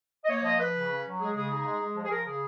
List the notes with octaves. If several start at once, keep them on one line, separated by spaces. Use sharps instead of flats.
D#5
A#3 C#5
F3 D#5
F3 B4
C#3
C#4
F#3
G#3 G#4
C#3 G#4
D#4 G#4
G#3
G#3
F3
G#4
F3 A#4
C#3 G#4